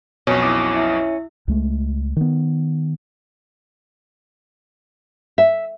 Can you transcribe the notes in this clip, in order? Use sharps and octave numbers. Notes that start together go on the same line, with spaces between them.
B1 F2 B2 C#4
E4 D6 D#6
E4 E5
C#2 G#3 A3
D#3 B3
E5